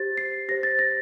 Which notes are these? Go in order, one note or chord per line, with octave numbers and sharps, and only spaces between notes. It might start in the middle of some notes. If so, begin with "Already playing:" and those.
Already playing: G4 C5 A6
C7
G4 C5 A#6
A6
A#6